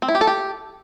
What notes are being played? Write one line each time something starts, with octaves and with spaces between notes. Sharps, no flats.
C4
E4
G4
A4
G4